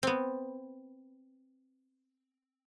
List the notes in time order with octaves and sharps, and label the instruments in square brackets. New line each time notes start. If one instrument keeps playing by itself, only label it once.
[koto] B3 C4